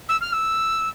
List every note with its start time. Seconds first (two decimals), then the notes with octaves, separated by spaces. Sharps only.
0.08 E6
0.21 F6
0.32 E6